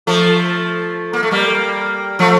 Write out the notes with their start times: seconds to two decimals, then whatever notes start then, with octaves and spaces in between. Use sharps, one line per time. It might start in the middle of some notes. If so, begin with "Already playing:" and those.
0.07 F3 A3
1.13 A#3
1.23 A3
1.31 G3 A#3
2.19 F3 A3